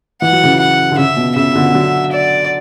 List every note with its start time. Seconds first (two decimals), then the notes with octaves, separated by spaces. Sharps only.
0.22 E3 F#5
0.32 F#3
0.44 C#3 E3
0.59 F#5
0.92 D3
0.97 C#3 E5
1.16 B2
1.36 C#3 E5
1.55 B2 D3
1.74 D3 F#3
2.12 D5